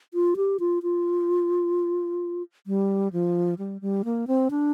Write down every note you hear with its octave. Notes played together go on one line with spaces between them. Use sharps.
F4
G4
F4
F4
G3
F3
G3
G3
A#3
C4
D4